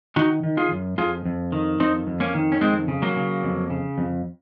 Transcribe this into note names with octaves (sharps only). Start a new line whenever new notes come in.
D#3 D#4 F#4
D#3
F4 G#4
F#2
F2 F4 G#4
F2
D#3
F2 C4 D#4
F2
A#3 C#4
D#3
C#4
F2 G#3 C4
C#3
F#3 A#3
C#3
F2
C#3
F2